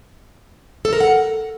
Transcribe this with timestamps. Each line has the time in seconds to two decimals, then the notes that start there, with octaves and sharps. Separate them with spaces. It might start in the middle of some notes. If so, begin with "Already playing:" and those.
0.85 A4
0.93 A#4
1.00 F#5